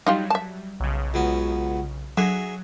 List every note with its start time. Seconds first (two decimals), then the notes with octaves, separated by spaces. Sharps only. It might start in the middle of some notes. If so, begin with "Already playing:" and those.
0.07 F#3 G3 D#4 F4 G4
0.30 E5 A5
0.80 B1 C#3
1.14 C#2 F#3 B3
2.17 D3 F#3 G#4 E5